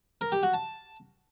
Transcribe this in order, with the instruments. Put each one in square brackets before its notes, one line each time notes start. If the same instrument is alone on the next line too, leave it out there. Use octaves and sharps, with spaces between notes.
[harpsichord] A#4
G4
F#4
A5